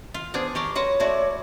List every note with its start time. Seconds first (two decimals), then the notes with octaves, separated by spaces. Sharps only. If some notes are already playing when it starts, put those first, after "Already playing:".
0.14 F4
0.34 B3 D4 G#4 C5
0.55 G4 A#4 D5 C#6
0.75 F#4 B4 C#5 F#5 C6
1.00 A3 E4 F#4 D5